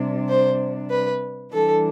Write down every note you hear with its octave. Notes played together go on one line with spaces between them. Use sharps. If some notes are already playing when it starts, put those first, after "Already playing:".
Already playing: C3 G3 D4
C5
B4
E3 G3 D4 A4